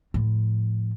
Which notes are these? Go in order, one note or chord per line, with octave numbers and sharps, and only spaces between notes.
A2 F3